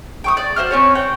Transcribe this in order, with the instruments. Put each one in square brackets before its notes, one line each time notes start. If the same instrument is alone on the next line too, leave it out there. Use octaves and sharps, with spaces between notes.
[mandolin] G5 C#6 D#6
D5
F#4 C5 D#5 F6
C4 C#4 C#5
F#5 G5